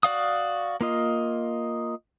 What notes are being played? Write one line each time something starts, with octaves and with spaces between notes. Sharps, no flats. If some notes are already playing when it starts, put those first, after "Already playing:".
F#4 D5 F5 D#6
A#3 F4 D#5